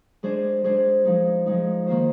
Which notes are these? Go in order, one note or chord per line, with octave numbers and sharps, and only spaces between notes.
G#3 D4 G#4 C5
G#3 D4 G#4 C5
F3 G#3 D#4
F3 G#3 D#4
D#3 A#3 F4 C5